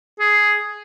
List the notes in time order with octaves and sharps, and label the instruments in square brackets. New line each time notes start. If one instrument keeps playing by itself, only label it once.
[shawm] G#4